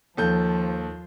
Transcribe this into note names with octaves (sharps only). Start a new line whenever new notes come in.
D#2 F3 A4 G6